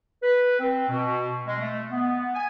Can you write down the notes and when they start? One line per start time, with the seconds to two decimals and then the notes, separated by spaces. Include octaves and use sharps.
0.23 B4
0.60 C4
0.89 B2
1.47 G#3
1.61 A3
1.91 B3
2.34 G#5